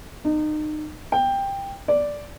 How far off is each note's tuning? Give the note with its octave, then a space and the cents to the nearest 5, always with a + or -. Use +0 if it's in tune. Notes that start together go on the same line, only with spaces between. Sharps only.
D#4 -30
G5 +10
D5 -5